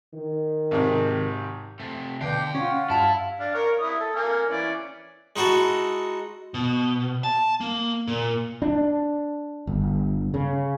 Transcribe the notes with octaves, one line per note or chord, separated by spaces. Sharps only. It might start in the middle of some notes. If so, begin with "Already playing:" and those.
D#3
G#1 G#2 C3
C3 A3
B2 D3 F5 G5 D6 G6
C#4 F4 F#5
G2 E4 F5 A5
D4 F5
A#4 C#5
E4 D#6
A4
A#3 G#5 F6
E3 C#4 D5
G#3 D#4 E4 F#4 A4
B2
A5
A#3
A#2
D4
G1
C#3